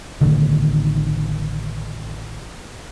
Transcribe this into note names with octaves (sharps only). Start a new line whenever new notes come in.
A1 D3 D#3